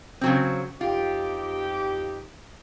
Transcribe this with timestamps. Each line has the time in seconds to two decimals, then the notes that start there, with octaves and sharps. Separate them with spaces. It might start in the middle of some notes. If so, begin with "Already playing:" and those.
0.21 C#3 F#3 C4
0.81 F2 D#4 F4 G4